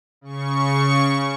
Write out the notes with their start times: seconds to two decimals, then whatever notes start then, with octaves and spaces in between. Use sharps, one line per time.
0.21 C#3 C#6